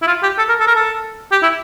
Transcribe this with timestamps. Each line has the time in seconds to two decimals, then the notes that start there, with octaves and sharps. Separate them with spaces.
0.02 E4
0.07 F4
0.23 G4
0.38 A4
0.49 A#4
0.60 A4
0.67 A#4
0.75 A4
1.32 G4
1.43 E4